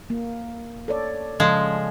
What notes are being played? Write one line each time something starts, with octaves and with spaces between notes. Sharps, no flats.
A#3
A4 C#5 D5
C#3 F3 G#3 G#4 A4